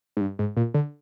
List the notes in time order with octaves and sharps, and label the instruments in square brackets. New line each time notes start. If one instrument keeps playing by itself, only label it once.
[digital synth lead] G#2
G2
G#2
A#2
D3